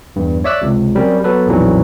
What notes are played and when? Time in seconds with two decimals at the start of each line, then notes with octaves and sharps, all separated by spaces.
0.16 E2 G2
0.44 C#5 D5 E5 D6 E6 F#6
0.61 C#2 C3
0.95 F#3 G3 C4 C#4 A#4
1.24 F#3 B3 A4 B4
1.47 B1 F2 A#2 E3 F#3 G3